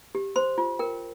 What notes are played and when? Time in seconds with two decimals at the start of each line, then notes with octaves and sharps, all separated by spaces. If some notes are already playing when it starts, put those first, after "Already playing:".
0.15 G4
0.36 C5 C6
0.58 F4
0.79 A#4 G5